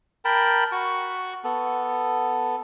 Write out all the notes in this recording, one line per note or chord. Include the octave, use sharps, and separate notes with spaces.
A#4 G5 A5 B5
F#4 C#6
B3 A4